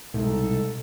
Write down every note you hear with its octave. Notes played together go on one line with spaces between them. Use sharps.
C2 B2 G#3 D#4 A4